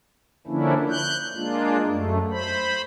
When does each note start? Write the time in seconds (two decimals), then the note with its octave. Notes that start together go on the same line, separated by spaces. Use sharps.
0.47 D3 F3 A#3 C#4 D4 E4
0.89 F#6 G6
1.35 G#3 A#3 D4 F4
1.86 F#2 A3
2.31 C5 B5